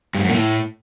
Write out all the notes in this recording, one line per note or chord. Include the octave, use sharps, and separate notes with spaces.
G2
G#2
F#2
A#2
A2